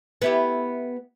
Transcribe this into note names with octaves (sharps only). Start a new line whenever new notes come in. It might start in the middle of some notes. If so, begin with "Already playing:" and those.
B3 E4 G4